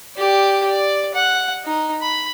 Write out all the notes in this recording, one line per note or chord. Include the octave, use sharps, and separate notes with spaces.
G4 D5
D5
F#5
D#4
B5